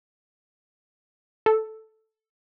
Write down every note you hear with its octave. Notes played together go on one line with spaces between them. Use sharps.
A4